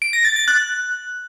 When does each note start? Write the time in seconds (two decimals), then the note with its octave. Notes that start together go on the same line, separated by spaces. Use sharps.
0.02 D7
0.13 A#6
0.25 A6
0.36 A6
0.48 F#6